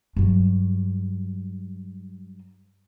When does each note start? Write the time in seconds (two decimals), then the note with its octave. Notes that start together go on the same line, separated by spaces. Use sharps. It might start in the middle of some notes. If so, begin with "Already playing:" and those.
0.16 G2 F#3